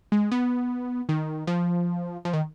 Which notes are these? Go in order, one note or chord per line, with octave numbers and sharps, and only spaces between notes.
G#3
B3
D#3
F3
F3
D#3